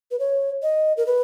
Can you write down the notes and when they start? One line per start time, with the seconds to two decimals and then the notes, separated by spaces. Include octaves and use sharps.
0.11 B4
0.19 C#5
0.62 D#5
0.97 A#4
1.06 B4